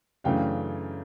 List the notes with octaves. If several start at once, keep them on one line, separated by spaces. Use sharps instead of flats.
F#2 C#3 E3 A3 D4 F5 G5